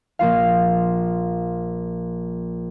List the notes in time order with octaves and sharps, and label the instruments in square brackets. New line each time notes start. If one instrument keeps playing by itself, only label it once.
[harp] A#1 A#3 F4 F5